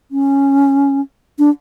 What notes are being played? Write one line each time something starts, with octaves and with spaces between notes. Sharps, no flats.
C#4
D4